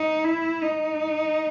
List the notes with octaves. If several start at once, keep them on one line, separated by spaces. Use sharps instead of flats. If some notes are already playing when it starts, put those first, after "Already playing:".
Already playing: D#4
E4
D#4